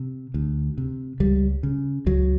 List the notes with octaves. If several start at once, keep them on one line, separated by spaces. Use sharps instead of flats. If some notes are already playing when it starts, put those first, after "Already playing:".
Already playing: C3
D2
C3
C#2 G3
C#3
C#2 F#3